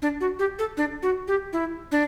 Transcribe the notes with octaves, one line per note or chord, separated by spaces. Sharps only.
D4
F#4
G4
A4
D4
F#4
G4
E4
D4